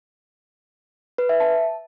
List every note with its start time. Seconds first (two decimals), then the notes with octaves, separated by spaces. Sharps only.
1.18 B4
1.29 E5
1.40 A5